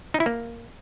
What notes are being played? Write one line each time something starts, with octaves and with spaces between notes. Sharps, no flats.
D#4
E4
A#3